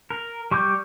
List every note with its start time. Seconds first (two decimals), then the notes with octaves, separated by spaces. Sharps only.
0.10 A#4
0.51 G3 C#6 D6 G6